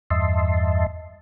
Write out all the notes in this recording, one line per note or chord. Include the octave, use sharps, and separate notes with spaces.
E2 G2 D#5 E5 A5 C6